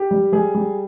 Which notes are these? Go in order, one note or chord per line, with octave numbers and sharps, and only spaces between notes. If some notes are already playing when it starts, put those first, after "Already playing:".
Already playing: G4
G3
G3 G#4
G3